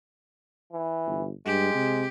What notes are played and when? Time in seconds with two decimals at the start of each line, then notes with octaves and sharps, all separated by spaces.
0.73 E3
1.06 G1
1.46 G2 G#3 G4
1.75 C3